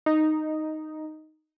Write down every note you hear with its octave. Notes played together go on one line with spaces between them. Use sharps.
D#4